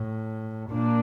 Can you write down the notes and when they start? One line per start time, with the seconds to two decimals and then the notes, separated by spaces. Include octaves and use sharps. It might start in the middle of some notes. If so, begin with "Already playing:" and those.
Already playing: A2
0.71 A#2 A#3 D4